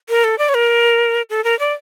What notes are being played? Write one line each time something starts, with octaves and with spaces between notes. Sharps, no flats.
A#4
A4
D5
C#5
A#4
A4
A#4
D5